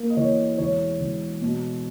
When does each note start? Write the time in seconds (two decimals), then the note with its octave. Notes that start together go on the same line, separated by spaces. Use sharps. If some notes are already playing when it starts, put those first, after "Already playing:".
Already playing: A#3 A#4
0.10 D#5
0.17 E2 C#5
0.58 E1 C#5
1.00 E1
1.41 B2